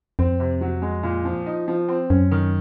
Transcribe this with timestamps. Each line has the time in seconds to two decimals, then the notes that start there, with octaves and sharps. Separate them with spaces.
0.19 F2 C4
0.40 C3
0.61 F#3
0.82 G#3
1.03 A#2
1.25 F3
1.46 D#4
1.68 F3
1.88 C4
2.10 F#2 C#4
2.32 D#3